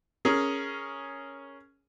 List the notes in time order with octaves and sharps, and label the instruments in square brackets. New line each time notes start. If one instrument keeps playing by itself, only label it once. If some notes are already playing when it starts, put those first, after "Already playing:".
[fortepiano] C#4 G#4 A#4